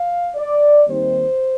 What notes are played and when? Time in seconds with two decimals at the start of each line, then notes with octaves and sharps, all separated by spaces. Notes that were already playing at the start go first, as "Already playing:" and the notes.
Already playing: F5
0.36 D5
0.88 D#2 D#3 G3 C4 D#4 C5